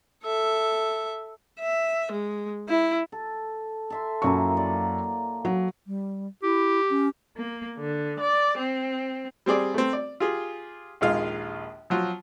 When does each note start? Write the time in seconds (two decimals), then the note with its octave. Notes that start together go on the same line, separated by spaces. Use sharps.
0.24 A4 E5
1.60 E5
2.12 G#3
2.69 E4
3.12 A4
3.90 A4 E5 C6
4.22 F#2 F#3 A#3 E4 C#6
4.57 A#4 D5 F5
5.45 F#3
5.87 G3
6.43 E4 G4
6.90 C#4
7.36 A#3
7.78 D3
8.18 D5
8.57 C4
9.46 G3 C4 G#4 D5
9.74 A3 C4
9.93 D5
10.20 F4 G4 G#4
11.01 A#1 D#2 G#3 F4 F5
11.90 F3 F#3 F4